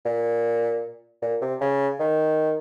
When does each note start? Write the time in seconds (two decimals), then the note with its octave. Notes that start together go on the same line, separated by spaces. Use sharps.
0.06 A#2
1.22 A#2
1.41 C3
1.61 C#3
2.00 D#3